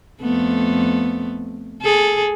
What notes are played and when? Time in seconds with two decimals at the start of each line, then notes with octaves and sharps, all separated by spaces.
0.21 F2 A3 B3
1.82 G#4 A4